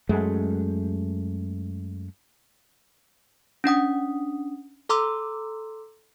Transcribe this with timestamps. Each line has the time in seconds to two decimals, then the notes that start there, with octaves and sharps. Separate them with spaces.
0.09 F#2 G#3 A3
3.64 C#4 D4 F#5 D#6
4.89 A4 A#5 C6 D6 E6